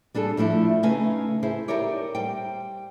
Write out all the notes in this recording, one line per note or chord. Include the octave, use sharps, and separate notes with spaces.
G3 D4 G#4 A4
F3 A3 D4 E4
C#3 A3 D#4 B4 F5 G#5
E4 G#4 C5
D#4 G4 A4 A#4 C#5 D5
G3 C5 G5